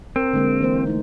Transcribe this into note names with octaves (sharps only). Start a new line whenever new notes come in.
C4 A#4
D3 G#3 A#3
E3 A#3 C5
A3 D#4